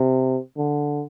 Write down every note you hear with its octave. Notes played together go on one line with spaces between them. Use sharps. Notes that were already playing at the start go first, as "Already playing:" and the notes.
Already playing: C3
D3